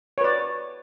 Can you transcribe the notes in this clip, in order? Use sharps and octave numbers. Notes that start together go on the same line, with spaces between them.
B4 C#5 D5